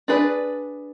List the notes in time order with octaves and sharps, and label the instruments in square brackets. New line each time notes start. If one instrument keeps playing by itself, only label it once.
[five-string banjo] D4 G#4 B4 D5